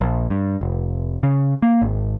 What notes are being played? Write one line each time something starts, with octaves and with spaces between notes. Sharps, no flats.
A#1
G2
F1
C#3
A#3
G#1